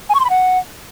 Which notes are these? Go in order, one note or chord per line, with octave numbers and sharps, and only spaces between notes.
G#5
C#6
C6
B5
F#5